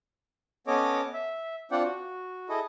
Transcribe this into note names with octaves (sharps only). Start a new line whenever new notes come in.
B3 C#4 A4 C#5 D#5 D6
E5
C4 D4 F4 D5 F#5 G5
F#4
E4 G#4 A4 D#5